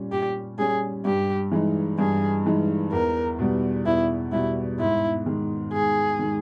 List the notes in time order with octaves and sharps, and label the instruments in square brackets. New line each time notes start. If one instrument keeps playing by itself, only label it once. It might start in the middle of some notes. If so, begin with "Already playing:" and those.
Already playing: [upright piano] A#2 G3 C#4
[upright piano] A#2 [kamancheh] G4
[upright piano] G3 C#4 [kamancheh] G#4
[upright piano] G2 [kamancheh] G4
[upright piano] E3 G#3 D#4
[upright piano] G2 [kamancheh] G#4
[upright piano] E3 G#3 D#4
[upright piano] E2 [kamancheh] A#4
[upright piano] B2 G3
[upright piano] E2 [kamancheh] E4
[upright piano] B2 G3 [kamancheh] E4
[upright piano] G#2 [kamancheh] E4
[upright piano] D#3 G#3
[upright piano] G#2 [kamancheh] G#4
[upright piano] D#3 G#3